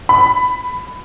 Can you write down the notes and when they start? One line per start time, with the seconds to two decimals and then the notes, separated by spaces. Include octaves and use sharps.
0.09 B5